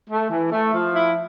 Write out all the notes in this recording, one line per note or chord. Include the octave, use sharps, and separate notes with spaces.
A3
E3
A3
F3
E4